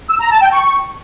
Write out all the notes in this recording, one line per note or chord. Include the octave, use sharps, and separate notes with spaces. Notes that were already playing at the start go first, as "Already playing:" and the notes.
E6
A#5
A5
G5
C#6